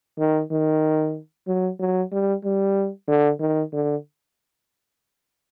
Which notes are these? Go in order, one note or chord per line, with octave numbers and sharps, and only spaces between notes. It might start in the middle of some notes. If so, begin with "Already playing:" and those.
D#3
D#3
F#3
F#3
G3
G3
D3
D#3
D3